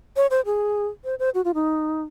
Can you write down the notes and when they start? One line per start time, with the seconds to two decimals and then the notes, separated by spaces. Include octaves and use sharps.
0.16 C#5
0.31 C5
0.46 G#4
1.05 C5
1.19 C5
1.34 F#4
1.45 F4
1.54 D#4